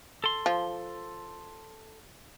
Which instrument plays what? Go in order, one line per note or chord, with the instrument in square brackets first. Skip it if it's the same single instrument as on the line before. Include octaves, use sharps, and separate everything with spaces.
[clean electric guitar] A4 C6
[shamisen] F3